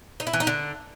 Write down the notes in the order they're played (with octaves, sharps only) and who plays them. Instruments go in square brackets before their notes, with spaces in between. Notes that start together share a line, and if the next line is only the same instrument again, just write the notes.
[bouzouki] D#4
E4
E3
D#4
D3